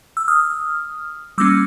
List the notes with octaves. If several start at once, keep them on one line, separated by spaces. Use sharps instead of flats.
E6
D#6 F6
G3 A#3 C#4 D6 E6